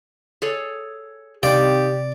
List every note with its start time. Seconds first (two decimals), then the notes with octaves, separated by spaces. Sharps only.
0.42 G#4 A4 C#5
1.43 C3 D#3 C4 G4 D5 F5